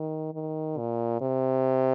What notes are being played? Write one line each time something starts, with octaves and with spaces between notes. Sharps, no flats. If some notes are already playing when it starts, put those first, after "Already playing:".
Already playing: D#3
D#3
A#2
C3